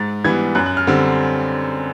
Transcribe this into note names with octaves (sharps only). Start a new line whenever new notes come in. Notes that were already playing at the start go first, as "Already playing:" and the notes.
Already playing: G#2 A6
E3 G3 B3 G#6
F#2 F#6
F#6
F6
D3 G3 C4